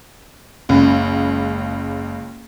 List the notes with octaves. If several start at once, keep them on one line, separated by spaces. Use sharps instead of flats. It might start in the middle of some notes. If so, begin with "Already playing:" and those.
F#1 C#2